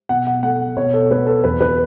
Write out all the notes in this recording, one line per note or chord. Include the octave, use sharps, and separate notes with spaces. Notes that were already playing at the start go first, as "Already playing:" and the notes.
B2 F#5
F#5
A3 F#5
B2 C#5
A4
A3 B4
A4
E2 B4
B4